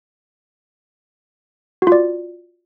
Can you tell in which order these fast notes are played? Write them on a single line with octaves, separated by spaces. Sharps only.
F#4 F4 D5